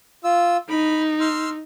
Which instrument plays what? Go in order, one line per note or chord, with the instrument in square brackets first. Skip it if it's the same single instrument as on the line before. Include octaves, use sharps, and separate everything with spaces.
[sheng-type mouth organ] F4 E6
[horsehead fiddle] D#4 [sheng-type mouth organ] B5
[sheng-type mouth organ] C6 E6 F6